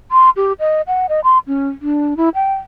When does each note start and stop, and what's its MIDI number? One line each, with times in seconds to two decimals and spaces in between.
0.11 0.30 84
0.36 0.53 67
0.60 0.82 75
0.87 1.06 78
1.09 1.20 75
1.24 1.38 84
1.47 1.68 61
1.82 2.17 62
2.17 2.29 64
2.35 2.54 79